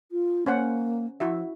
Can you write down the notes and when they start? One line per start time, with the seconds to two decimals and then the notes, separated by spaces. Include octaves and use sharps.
0.12 F4
0.46 A#3 C#4 C5 F#5
1.20 F3 E4 F#4 E5